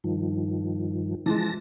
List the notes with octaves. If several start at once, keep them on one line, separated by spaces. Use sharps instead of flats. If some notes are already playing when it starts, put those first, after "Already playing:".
G2 D#3 F3
E3 F3 G#3 A5 A#6